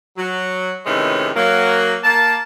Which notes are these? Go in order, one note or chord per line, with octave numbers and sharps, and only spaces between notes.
F#3
A2 C3 D#3 E3 G#3 C#4
F#3 A#3
A#3 A5